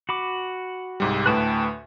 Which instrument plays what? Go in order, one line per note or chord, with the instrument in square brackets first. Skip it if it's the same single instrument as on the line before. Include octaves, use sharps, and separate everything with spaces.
[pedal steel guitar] F#4 B5 D6
[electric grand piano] C2 G#2 G3
[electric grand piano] D2 A2 B4 [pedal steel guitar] G5 A5 F#6